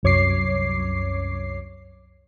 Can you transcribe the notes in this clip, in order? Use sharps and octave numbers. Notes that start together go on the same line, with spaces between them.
C2 F#2 C#5 D6 C7